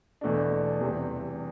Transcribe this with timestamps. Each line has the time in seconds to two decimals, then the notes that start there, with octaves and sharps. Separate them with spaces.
0.21 E2 B2 A3 D4
0.81 E2 C3 G3